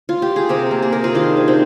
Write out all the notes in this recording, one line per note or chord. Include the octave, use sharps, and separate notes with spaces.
F4
G4
G#4
C3 G4 A#4
A#3
G#4
C3 A#4
F4 G#4
D#3 D4 F4
C3
C4 D#4